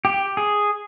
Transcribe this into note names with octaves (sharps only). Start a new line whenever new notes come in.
G4
G#4